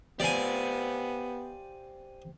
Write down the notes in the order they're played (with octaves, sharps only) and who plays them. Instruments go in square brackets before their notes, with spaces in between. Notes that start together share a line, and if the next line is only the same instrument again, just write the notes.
[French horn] B3 [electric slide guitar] G4 C5 F5 [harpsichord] D5 G#5